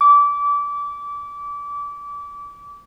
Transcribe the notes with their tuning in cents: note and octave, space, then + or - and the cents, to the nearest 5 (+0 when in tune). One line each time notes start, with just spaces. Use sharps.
D6 -25